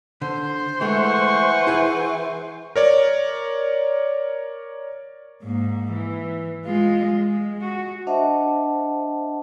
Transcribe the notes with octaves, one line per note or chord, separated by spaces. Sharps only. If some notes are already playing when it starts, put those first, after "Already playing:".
D3 C5
E3 G#3 A3 F#5 C#6
E4 G#4 G#5
A#4 C#5 D5
G#2 A#3
E3
G#3 F4
G#3
F#4
D4 C5 D#5 E5 F#5 A5